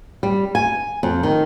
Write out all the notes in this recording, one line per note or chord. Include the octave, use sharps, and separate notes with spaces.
G3
G#5
F2
D#3